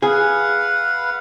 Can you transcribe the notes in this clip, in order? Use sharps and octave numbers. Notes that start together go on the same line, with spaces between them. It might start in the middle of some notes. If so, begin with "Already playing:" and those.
G#4 B4 F5 F#5